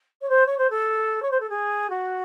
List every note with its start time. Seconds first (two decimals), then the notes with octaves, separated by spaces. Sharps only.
0.21 C#5
0.29 C5
0.46 C#5
0.58 C5
0.70 A4
1.22 C#5
1.31 C5
1.40 A4
1.49 G#4
1.90 F#4